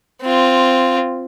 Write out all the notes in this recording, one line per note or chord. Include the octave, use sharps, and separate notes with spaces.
C4 F4